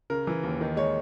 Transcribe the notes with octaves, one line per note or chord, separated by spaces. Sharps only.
C#3 A#4
E3
D#2
D#3
G#3 C#5